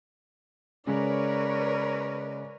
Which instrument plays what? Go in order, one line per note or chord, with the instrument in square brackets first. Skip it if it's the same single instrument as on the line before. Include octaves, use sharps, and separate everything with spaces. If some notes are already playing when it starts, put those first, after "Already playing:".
[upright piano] C#3 G#3 [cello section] A#4 B4 C#5 [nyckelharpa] D5